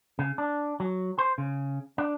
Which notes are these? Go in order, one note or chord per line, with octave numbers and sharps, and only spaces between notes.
C#3
D4
F#3
C5
C#3
D4